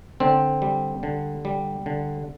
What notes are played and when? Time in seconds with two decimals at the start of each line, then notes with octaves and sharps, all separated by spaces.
0.20 D3 C4
0.62 G3
1.03 D3
1.45 G3
1.86 D3